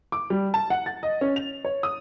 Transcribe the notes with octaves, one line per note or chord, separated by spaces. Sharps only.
D6
G3
A5
F#5
A6
D#5
C#4
F7
C#5
D#6